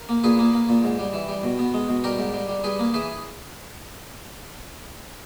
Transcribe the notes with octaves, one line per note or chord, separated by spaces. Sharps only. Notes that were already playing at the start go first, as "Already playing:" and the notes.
Already playing: A#4
A#3
A#2 G#4 B4
A#3
A#3
A#2
G#2
G3
E3
G3
B2
B3
G#3
B2
G3 G4 A#4
G#2
G3
G3
G3 G#4 B4
A#3
E3 G#4 B4